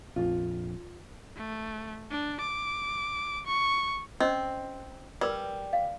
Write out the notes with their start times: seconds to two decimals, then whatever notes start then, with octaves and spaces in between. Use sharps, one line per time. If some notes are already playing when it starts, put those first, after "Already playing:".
0.16 A#1 F2 F4
1.36 A3
2.11 D4
2.41 D6
3.47 C#6
4.20 C4 C#4 D#5
5.21 G3 A#4 B4 D5
5.73 F5